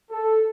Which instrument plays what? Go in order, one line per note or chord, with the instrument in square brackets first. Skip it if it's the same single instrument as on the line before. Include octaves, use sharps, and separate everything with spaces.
[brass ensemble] A4